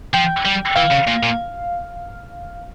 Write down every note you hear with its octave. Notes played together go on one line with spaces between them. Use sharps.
F3 G5
G3
E3 F5
C#3
A#2
A#2